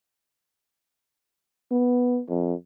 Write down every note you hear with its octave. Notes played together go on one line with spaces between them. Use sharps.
B3
F2